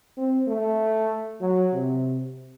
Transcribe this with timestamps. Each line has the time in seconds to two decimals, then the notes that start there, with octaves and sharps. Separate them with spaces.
0.17 C4
0.48 A3
1.41 F#3
1.73 C3